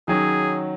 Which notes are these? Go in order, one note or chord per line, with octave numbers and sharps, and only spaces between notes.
D#3 F#3 C#4 G#4